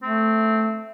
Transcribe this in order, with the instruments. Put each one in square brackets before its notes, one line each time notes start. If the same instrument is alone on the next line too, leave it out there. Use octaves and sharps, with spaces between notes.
[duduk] A3 [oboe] C4